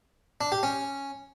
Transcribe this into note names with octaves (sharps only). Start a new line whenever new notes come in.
D4
G4
C#4